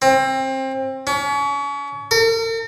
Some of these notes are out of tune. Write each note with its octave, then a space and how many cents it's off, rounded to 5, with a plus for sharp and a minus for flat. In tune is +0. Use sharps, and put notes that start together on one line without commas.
C4 +25
C#4 +35
A#4 -45